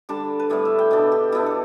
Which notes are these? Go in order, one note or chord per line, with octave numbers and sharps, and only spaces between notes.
D3 G3 D4 A5
B4
A2 G3 B3 D5
E5
G5
B2 B3 D4 A5
G4
B2 B3 D4 E4
A4